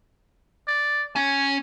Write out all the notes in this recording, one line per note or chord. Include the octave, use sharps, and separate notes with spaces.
D5
C#4 C#5 G#5